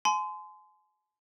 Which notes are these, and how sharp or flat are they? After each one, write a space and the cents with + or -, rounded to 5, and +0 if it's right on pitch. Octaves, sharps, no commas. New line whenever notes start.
G#5 +35 C6 -25